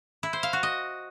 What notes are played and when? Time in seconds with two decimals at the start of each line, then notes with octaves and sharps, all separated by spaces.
0.23 E4
0.33 C5
0.43 F5
0.53 F#4
0.63 D#5